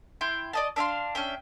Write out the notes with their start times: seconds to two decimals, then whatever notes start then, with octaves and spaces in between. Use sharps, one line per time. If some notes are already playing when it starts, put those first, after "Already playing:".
0.21 E4 G5 C6
0.53 D5 D#5 A5
0.76 D4 E5 F5 C6
1.15 C#4 D4 E5 G5